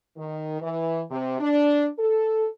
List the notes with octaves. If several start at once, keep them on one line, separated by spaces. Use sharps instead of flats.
D#3
E3
C3
D4
A4